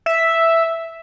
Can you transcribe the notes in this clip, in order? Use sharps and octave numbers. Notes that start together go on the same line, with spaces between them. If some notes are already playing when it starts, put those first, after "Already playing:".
E5